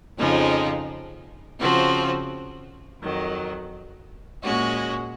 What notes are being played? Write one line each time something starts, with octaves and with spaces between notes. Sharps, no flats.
F2 C#3 F3 G#3 D#4
C#3 F3 C4 F#4
F2 D#3 F#3
A#2 G#3 C#4 F#4